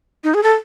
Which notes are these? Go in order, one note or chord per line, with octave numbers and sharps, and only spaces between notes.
D#4
G#4
A4